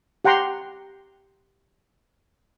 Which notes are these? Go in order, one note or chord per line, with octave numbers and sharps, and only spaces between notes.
G4 F#5 G5 A#5 C6